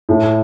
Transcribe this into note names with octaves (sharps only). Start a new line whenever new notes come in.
A2